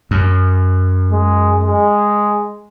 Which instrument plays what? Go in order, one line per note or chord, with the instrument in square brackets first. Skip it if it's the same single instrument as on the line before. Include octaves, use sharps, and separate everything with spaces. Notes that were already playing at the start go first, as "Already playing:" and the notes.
[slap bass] F#2
[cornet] G#3
G#3